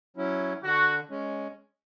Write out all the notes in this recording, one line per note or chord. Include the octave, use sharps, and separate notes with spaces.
F#3 C#4 E4
D3 F#4
G#3 C#4